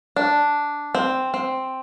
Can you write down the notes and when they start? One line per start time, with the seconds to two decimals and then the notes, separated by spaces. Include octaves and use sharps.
0.16 D4
0.95 C4
1.34 C4